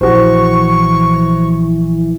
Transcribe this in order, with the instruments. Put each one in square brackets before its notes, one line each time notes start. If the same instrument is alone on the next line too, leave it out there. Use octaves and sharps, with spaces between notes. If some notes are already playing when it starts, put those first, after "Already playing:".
[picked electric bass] A#1 [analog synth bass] E3 [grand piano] F#4 C5 [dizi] C#6